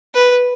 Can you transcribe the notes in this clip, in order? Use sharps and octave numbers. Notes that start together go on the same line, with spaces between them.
B4